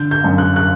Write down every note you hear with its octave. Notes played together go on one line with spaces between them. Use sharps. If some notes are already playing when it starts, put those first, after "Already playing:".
Already playing: D3 G6
G6
F#2
F#6
F#6